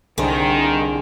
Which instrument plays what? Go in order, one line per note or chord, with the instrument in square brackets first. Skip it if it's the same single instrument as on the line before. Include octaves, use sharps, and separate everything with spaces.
[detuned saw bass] C2 [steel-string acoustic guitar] D3 [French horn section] D#3 [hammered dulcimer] G#4 C5